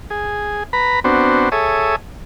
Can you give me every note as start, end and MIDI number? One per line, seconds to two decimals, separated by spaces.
0.10 0.63 68
0.73 1.00 71
0.73 1.00 82
0.73 1.00 83
1.04 1.49 59
1.04 1.49 60
1.04 1.49 62
1.04 1.49 66
1.04 1.49 72
1.52 1.96 68
1.52 1.96 69
1.52 1.96 73
1.52 1.96 76
1.52 1.96 87